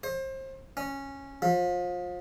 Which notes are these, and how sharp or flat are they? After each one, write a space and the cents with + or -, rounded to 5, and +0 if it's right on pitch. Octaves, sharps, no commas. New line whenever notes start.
C5 +30
C#4 -10
F3 +30